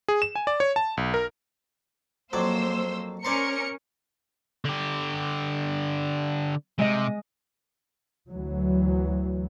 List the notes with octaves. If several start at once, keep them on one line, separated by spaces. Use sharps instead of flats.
G#4
E7
G#5
D5
C#5
A5
B1
A#4
F2 F#3 A#3 C5 D5 E6
C#4 A#4 C5 D5 C6 C#7
D3 G4
C3 G#3 D#5
D2 E3 F#3